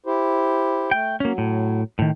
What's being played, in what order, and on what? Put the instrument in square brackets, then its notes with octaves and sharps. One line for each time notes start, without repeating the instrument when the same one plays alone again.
[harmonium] E4 G4 C5
[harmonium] A3 [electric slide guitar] G5
[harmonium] F#3 [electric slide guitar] A#3 C#4
[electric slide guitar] A2
A2 D#3